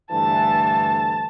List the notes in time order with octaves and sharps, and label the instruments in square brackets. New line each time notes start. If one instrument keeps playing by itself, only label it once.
[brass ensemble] D2 G2 E3 [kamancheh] A5